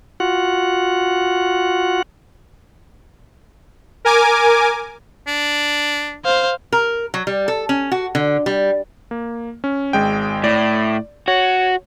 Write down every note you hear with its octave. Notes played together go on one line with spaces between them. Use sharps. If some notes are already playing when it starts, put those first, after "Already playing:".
F4 F#4 F#5
A#4 G#5 D6
D4
C5 F5
A#4
F#3
G3
A4
C#4
F#4
D3
G3
A#3
C#4
G#1 G#3 G5
A2 D5
F#4 C#5